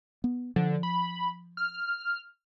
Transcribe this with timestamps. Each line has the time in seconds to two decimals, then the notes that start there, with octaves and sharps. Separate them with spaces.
0.24 B3
0.56 D3 F3
0.83 B5
1.57 F6